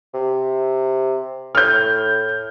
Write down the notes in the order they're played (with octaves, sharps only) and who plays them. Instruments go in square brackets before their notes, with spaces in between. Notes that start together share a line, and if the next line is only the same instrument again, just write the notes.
[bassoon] C3
[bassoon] A2 [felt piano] F6 G6